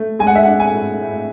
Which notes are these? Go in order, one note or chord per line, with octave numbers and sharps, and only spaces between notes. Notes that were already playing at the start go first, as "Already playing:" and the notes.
Already playing: A3
G#3 G#5
F#5
E5
F#5
D4
G#5
A2
A2